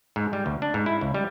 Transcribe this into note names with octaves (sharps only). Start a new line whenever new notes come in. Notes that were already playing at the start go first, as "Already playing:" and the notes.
G#2
G3
D2
D4
G#2
E4
C#2
G3